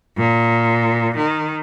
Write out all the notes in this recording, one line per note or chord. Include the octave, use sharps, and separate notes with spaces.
A#2
D#3